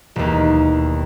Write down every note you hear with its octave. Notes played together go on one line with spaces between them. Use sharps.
E1 D#2